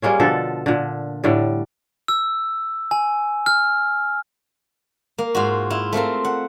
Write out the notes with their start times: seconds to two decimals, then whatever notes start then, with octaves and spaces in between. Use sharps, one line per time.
0.02 G3 G#3 A#3 C#4
0.20 B2 D3 F3 A4
0.66 A#2 D3
1.24 A2 D3 G3
2.08 E6
2.91 G#5
3.46 F6
5.18 A#3
5.35 G#2 F4 F#4
5.70 E4 F4
5.93 A3 C4 F4 A#4
6.24 F#5